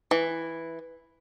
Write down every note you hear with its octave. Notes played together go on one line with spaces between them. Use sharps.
E3